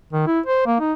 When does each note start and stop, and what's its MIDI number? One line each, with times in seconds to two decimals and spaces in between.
0.13 0.25 51
0.27 0.40 64
0.46 0.61 72
0.66 0.76 58
0.80 0.93 63